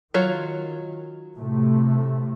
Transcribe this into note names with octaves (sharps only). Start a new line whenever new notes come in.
D#3 F#3 F4 C#5
A2 C3 A3